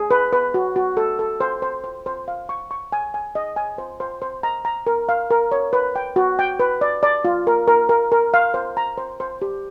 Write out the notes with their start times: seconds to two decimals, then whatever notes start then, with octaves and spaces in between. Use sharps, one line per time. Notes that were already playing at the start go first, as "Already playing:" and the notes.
Already playing: G#4
0.11 B4
0.33 B4
0.54 F#4
0.76 F#4
0.97 A4
1.19 A4
1.40 C5
1.62 C5
1.84 C5
2.06 C5
2.28 F5
2.49 C#6
2.71 C#6
2.92 G#5
3.14 G#5
3.35 D#5
3.56 G#5
3.78 C5
4.00 C5
4.22 C5
4.43 A#5
4.65 A#5
4.87 A#4
5.09 F5
5.31 A#4
5.52 C#5
5.73 B4
5.96 G5
6.16 F#4
6.39 G5
6.60 B4
6.81 D5
7.03 D5
7.25 F4
7.47 A#4
7.68 A#4
7.89 A#4
8.12 A#4
8.34 F5
8.54 C5
8.77 A#5
8.97 C5
9.20 C5
9.42 G4